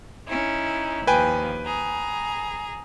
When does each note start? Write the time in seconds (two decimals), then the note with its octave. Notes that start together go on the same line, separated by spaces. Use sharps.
0.28 C#4 D#4 E4
1.07 D#2 F3 B4 G5 G#5
1.65 G#4 A#5